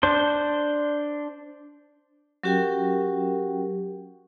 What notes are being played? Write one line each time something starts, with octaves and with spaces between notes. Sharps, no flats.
D4 C5
F#3 C#4 F#4 G4 A#4 G5